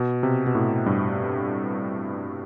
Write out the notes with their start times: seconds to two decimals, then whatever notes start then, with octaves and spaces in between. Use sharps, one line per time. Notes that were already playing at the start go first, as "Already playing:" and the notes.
Already playing: B2
0.23 C3
0.47 B2
0.55 A2
0.86 G2